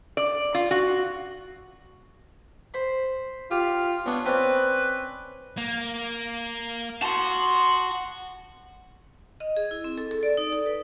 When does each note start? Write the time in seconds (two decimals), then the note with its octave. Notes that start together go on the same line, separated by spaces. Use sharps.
0.17 D5
0.55 F4
0.71 F#4
2.74 C5 B5
3.51 F4 G4
4.06 B3 C#4 D4
4.25 C4 C#4 B4 D5
5.57 A#3
7.02 F#4 A5 C6
9.40 D#5
9.57 G#4
9.71 E4
9.84 C4
9.98 A4
10.11 A4
10.23 D5
10.37 D#4
10.53 A4
10.66 B4